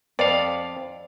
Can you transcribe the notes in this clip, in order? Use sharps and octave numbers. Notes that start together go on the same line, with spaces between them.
F2 D5 F5